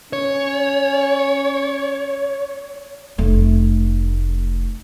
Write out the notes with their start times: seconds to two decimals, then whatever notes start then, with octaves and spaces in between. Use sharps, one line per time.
0.13 C#4 C#5
3.18 F1 A3